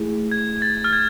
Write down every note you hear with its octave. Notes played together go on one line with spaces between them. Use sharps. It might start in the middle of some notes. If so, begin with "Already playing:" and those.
Already playing: A3 E4 G#4
G#6
A6
F6
G#6